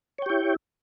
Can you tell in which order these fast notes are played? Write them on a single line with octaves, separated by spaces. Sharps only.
C#5 G5 G4 E4